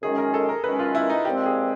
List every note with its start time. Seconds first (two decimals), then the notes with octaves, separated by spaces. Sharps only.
0.02 F#2 D#3 G#3 C#4 G#4
0.18 A#4
0.34 A4
0.49 A#4
0.64 F#2 D#3 G#3 C#4 B4
0.79 F4
0.95 E4
1.10 D#4
1.25 A#2 F3 G#3 C4 G4
1.46 G#4